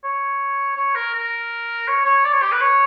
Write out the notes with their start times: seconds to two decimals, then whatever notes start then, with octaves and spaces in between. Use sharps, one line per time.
0.04 C#5
0.76 C#5
0.95 A#4
1.14 A#4
1.88 C#5
2.05 C#5
2.24 D5
2.32 C#5
2.42 G4
2.52 B4
2.61 C#5